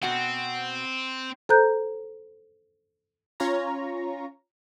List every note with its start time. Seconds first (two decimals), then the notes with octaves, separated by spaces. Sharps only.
0.03 B2 C4 F#4 F#5
1.49 A4 C5 A#5 F#6 G6
3.40 C#4 F4 C#5 A#5